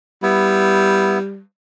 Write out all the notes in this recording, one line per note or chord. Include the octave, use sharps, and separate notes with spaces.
G3 B3 E4